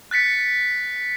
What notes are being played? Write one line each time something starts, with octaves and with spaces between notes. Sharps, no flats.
F#6 A6 B6 C#7